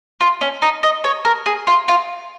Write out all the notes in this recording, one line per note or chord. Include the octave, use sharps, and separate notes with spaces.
F4
C#4
D#4
D#5
C#5
A#4
G#4
F4
F4